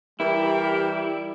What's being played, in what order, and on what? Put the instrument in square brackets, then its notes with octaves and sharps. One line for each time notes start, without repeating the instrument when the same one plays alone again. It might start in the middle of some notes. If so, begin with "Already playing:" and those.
[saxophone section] E3 G4 A#4 [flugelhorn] G3 [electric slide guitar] E4